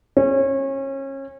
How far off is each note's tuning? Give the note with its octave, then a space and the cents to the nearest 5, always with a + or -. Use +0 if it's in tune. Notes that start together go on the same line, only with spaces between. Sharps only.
C#4 -30